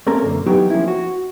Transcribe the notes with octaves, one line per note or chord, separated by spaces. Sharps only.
A3 A#3 C4 C#4 A4 A#4
B1 F#2 D3 A#3
E3 F#3 B3 D#4 G4 C#5
F3 A#3 C#4 E4
F#4